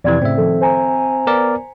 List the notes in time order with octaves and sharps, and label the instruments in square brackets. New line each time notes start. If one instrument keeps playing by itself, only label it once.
[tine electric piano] F2 C3 E3 [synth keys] D5 G#6
[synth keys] A2 C#3 [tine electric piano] C4 E5
[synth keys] D#3 F3 A4
C5 G#5 A#5
[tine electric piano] B3 A#4 D5